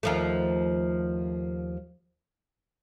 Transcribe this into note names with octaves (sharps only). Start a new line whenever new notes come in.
D#2 F3 A3